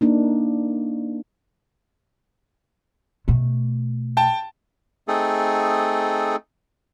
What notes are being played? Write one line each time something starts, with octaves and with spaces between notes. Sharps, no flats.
A#3 D4 D#4
B2 A3
G5 A5
A3 C4 D#4 G#4 A4